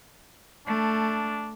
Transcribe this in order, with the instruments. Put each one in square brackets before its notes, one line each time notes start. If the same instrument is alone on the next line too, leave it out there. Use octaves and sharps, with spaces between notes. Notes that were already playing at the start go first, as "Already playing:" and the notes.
[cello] A3 [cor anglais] D4